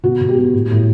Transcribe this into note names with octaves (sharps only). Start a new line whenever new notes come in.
B2 F#4
B2
G4
B3
A2
A2